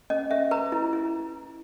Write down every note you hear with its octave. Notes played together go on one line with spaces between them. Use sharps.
C#4 D#5
C#4 E5
B4 A#5
E4
E4